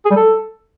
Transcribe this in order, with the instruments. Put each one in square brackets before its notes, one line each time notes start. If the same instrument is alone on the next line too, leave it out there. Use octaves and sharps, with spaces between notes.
[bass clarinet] G#4
G3
A4